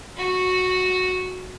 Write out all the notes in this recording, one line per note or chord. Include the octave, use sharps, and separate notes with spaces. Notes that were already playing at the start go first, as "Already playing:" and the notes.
F#4